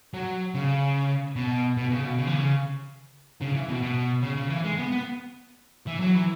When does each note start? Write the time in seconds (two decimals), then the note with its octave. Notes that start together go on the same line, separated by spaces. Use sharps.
0.14 F#3
0.54 C#3
1.36 B2
1.77 B2
1.91 C#3
2.04 B2
2.18 C#3
2.27 E3
2.35 C#3
3.41 C#3
3.55 E3
3.69 B2
3.82 B2
4.23 C#3
4.37 C#3
4.50 E3
4.64 G#3
4.78 B3
4.92 B3
5.87 E3
6.00 F#3
6.15 E3